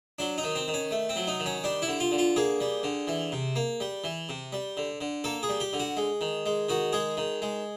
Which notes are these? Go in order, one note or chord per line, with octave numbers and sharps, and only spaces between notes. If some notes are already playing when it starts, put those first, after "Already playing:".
F#3 D4
D#4
D#3
C4
D#3
C#4
A3
C4
F#3
D#4
D#3
C#4
G3 D4
E4
D3
F4
D3
F4
A#3 G#4
G3
D3
E3
C3
A#3
G3
E3
C3
G3
D3
D3
A#3 A4
G#4
G3
G4
D3
F#4
G#3
D#3
G#3
D#3 F#4
G#3 G#4
D#3
G#3